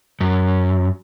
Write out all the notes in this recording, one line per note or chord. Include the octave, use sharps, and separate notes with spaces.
F#2